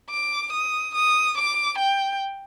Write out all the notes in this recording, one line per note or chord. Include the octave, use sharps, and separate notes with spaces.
D6
D#6
D#6
D6
G5